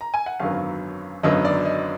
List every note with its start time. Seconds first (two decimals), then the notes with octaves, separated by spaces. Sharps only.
0.01 A#5
0.14 G#5
0.26 F#5
0.40 G#1 F#2 D3 F#3 B3 F5
1.23 G#1 F#2 D3 F#3 B3 D#5
1.45 D5
1.65 D#5